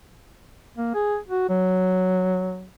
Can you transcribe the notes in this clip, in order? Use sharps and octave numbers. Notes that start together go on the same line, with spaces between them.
A#3
G#4
F#4
F#3